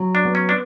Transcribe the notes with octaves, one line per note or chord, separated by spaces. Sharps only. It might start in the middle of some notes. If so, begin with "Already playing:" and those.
Already playing: F#3
D4
B3
C#4
D4